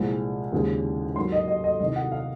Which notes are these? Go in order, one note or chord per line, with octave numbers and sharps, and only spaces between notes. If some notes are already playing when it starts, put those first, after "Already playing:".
Already playing: C2 A#2 F3 G#3
D#2 C#3 F3 G#3
G#2 F#3 A#3 C6
D#5
D#5
D#5
C2 C3 D#3 D#5
F#5
F5